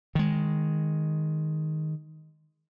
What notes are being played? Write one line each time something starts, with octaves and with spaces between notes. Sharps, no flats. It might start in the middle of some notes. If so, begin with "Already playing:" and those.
D#3 G#3